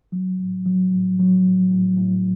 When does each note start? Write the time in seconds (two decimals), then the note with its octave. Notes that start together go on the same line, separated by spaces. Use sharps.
0.12 F#3
0.39 A2
0.66 F#3
0.91 A2
1.19 F#3
1.44 A2
1.71 A2
1.97 A2